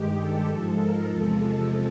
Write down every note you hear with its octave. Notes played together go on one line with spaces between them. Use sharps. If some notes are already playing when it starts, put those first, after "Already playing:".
Already playing: G2 D#3 G#3 G4
A4
G#2 F3 G#3
A#4
E2 C3 F3 G#3 A4